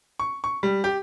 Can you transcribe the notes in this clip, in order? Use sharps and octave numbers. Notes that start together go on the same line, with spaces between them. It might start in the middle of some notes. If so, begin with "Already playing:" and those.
C#6
C#6
G3
G4